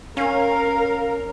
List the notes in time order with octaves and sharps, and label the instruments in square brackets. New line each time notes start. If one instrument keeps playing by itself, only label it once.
[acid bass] C#4 [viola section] A#4 [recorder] F5